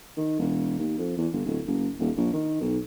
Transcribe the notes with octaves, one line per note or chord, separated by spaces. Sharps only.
D#3
E1
D#2
F2
E2
G1
D1
F#1
D#1
A#1
D#3
B1